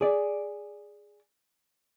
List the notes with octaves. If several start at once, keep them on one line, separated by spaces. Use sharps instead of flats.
G#4 D5